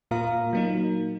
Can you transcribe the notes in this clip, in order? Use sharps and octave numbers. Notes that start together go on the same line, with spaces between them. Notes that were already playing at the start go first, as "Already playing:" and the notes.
A#2 A#3 F4 F5 A#5
F#3 A#3 D#4